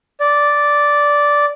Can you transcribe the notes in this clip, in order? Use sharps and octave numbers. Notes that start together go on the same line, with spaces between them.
D5